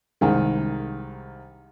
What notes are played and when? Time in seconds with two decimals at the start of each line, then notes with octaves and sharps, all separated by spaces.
0.21 C2 D#3 G#3